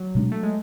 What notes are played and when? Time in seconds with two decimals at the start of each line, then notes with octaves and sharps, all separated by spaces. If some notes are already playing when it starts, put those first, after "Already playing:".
Already playing: F#3
0.15 B2 G#3 B3 D4
0.32 A3
0.43 G#3